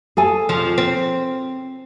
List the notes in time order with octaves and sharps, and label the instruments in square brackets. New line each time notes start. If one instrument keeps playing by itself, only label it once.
[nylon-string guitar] G#4 A4 G#5
[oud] F2 F3
C4